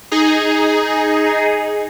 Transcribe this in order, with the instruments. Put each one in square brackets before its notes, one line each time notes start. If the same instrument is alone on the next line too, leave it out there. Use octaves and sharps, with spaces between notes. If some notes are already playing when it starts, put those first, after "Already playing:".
[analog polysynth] D#4 G#4